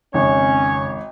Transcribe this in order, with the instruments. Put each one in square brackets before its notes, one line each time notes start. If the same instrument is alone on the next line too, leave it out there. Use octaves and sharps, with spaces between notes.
[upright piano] G#1 [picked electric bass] F2 C#3 C4 [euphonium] C#4 [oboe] C#5